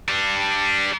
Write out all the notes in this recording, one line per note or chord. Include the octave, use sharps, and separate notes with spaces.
G3 D4